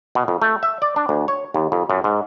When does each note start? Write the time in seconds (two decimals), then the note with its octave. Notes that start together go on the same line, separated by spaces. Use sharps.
0.15 B2
0.28 F2
0.42 A3
0.63 E5
0.82 D5
0.96 D4
1.09 D2
1.28 C#5
1.54 D#2
1.72 F2
1.90 F#2
2.04 G#2